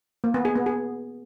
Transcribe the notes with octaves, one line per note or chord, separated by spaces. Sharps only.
A#3
B3
G#4
B3
G#4